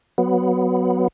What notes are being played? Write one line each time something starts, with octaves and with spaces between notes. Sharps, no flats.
F#3 B3